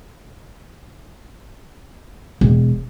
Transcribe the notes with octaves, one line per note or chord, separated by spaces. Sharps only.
E1